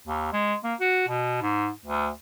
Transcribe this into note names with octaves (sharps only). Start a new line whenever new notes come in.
D#2
G#3
A#3
F#4
B2
G#2
D2